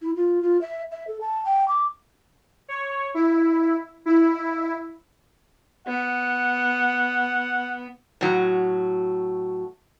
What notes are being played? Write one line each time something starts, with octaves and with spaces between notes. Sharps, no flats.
E4
F4
F4
E5
E5
A4
A5
G5
D6
C#5
E4
E4
B3 F#5
A2 F#3